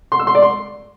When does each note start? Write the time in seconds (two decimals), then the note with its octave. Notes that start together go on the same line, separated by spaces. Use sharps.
0.12 C6
0.19 E6
0.27 C6
0.35 D5
0.42 C6